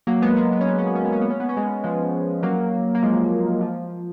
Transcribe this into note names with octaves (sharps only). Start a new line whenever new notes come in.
F#3 A#3
G#3 B3
G#3 B3
B3
C#4
B3
C#4
B3
C#4
B3
C#4
B3
C#4
B3
C#4
G#3 B3
F3 G#3
F#3 A#3
A#3
F3 G#3
F3